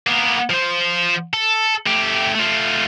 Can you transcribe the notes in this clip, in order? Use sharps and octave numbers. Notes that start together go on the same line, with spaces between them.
A#3 B3
F3 C5
A4
A3 G4
A3 F4